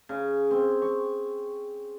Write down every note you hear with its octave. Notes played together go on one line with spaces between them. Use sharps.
C#3
C4
C#6